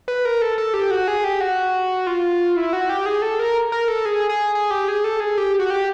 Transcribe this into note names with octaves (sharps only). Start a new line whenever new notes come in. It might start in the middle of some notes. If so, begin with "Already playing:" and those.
B4
A#4
A4
A4
G4
F#4
G#4
G4
F#4
F4
E4
F#4
G4
G#4
A4
A#4
A#4
A4
G#4
G#4
G#4
G4
G#4
A4
G#4
G4
F#4
G4